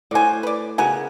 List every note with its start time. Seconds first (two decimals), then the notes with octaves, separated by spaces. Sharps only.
0.11 A2 F#4 C5 D5 G#5
0.43 B4 D5
0.78 C#3 B3 F#4 A#4 G#5